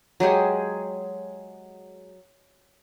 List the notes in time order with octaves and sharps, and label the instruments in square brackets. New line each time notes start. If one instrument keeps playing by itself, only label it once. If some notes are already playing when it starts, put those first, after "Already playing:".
[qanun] F#3 G#3 G4 G#4